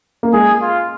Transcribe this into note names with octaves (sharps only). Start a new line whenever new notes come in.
A#3
G#3 G#4
F4